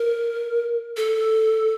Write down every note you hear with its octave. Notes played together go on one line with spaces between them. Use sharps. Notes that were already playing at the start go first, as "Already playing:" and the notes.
Already playing: A#4
A4